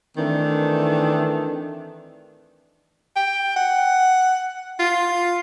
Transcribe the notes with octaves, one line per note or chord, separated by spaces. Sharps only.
D#3 E3 A3 C4 D4
G5
F#5
F4